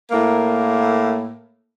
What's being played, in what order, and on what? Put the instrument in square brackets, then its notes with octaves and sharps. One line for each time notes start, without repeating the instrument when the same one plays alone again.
[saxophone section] A2 A#3